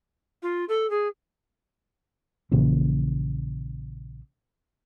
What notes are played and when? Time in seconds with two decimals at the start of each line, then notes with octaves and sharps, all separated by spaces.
0.42 F4
0.68 A4
0.90 G#4
2.51 A#1 A#2 C#3 E3